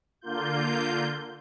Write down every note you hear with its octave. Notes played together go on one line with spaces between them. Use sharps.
D3 A#3 F4 G6